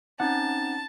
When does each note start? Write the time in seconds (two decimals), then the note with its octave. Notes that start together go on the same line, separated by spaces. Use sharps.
0.20 C4 C#4 D#4 F#5 A5